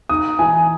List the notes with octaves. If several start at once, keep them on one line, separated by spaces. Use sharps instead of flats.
D#4 D#6
E3 G#5